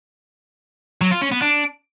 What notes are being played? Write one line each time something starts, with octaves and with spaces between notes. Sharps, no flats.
F#3
F4
C#4
B3
D4